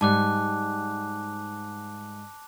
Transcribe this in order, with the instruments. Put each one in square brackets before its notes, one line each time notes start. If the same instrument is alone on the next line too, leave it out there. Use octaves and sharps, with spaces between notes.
[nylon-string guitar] G#2 G3 [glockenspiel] A5 D6 F#6